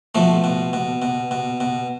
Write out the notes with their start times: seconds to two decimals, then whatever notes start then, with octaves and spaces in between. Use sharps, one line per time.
0.15 B2 F3 A3
0.44 B2
0.73 B2
1.02 B2
1.31 B2
1.60 B2